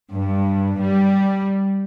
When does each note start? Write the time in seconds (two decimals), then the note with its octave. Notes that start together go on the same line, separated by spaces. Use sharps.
0.11 G2
0.79 G3